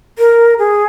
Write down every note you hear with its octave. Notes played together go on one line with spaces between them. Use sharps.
A#4
G#4